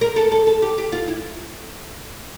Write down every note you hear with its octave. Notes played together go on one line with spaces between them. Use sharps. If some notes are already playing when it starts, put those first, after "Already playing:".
A#4
A4
A4
A4
G4
G4
F4
E4